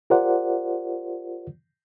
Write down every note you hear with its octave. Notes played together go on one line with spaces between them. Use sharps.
F4 G4 A#4 C5 D5 F#5